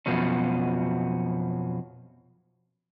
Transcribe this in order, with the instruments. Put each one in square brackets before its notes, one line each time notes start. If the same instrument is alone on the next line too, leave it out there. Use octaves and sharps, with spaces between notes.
[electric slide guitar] F2 B2 F3 F#3 C#4